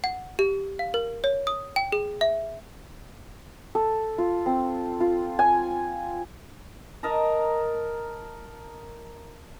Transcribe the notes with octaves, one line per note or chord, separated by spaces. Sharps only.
F#5
G4
F5
A#4
C#5
D#6
G5
G#4
E5
A4
F4
C4
F4
G#5
A#4 D#5 A5 A#5